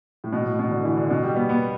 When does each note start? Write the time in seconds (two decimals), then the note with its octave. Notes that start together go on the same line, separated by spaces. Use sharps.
0.24 A2
0.33 B2
0.45 A2
0.59 B2
0.71 D3
0.85 E3
0.97 D3
1.10 B2
1.24 G3
1.36 B3
1.49 B3